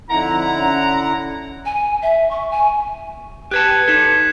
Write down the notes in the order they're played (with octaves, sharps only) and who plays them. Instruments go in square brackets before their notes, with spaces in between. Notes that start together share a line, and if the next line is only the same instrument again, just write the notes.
[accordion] D3 E4 F#5 [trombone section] F3 C4 D#4 [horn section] A#5
[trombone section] C#4
[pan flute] G#5
E5
C#6
G#5
[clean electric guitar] G4 B4 A5 [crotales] F#6 G#6 C#7
[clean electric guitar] D#4 A4 [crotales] G#6 B6 E7